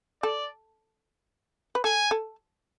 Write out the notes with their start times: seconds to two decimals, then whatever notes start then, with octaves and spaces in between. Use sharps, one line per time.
0.22 A4 D5
1.75 B4
1.84 A4 G#5
2.11 A4